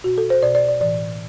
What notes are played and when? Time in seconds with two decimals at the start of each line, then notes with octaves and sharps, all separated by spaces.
0.04 B2 F#4
0.18 A4
0.30 C5
0.42 B2 D5
0.55 D5
0.68 D5
0.81 A2 E3 D5